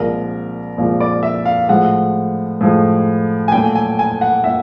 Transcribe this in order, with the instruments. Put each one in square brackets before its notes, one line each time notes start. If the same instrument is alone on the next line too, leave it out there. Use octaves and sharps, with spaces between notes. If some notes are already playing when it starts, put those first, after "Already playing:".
Already playing: [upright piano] C2 A#2 F3 G#3 A#4
C2 A#2 F3 G#3
D5
E5
F5
A2 F3 G#3 F#5
A2 F3 G#3
G#5
A#2 F#3 A3 G5
G#5
G#5
F#5
A#2 E5